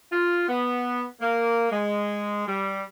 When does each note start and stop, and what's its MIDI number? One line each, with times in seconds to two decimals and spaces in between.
0.11 0.43 65
0.48 1.04 59
1.20 1.69 58
1.70 2.46 56
2.46 2.82 55